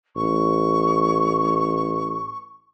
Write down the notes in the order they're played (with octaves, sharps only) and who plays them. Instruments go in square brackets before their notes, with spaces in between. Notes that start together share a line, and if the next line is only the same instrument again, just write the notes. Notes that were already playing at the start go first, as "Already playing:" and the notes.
[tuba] A1 [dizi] C#6